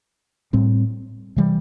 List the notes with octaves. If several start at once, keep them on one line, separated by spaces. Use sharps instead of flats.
A2 G3 C4
C3 E3 G3